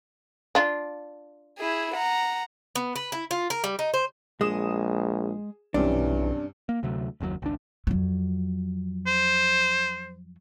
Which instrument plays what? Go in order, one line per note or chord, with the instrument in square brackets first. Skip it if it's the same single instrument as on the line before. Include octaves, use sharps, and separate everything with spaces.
[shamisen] D4 F4
[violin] E4 G#4
F#5 A#5
[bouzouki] B3
B4
E4
F4
A#4
G3
D#4
C5
[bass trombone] A#1 [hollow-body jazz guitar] G#3 [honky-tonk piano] G#4 D#6 E7
[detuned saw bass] B1 [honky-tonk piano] G2 C3 C#4 [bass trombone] E3 [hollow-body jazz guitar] D4
[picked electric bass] A#3
D2 C3 F#3 A3
F#1 D#2 B2 F#3
G#1 C#2 D4
[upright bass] F2 F#3
[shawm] C5